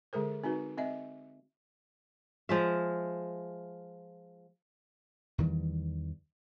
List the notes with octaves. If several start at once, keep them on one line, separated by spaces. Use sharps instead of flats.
D3 G#3 G#4 A#4 C5
C4 D#4 F#4 B4
C4 D#5 E5
F3 G#3 E5
E2 D#3 E3 G3